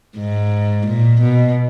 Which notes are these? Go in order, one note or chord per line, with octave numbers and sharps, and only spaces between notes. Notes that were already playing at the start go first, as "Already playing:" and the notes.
G#2
A#2
B2